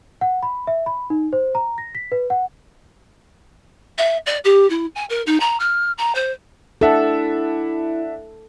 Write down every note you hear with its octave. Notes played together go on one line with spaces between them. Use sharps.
F#5
B5
E5
B5
D#4
C5
A#5
A#6
B6
B4
F#5
E5
D5
G4
E4
G#5
A#4
D#4
A#5
F6
A#5
C5
D4 E4 A4 E5 F#5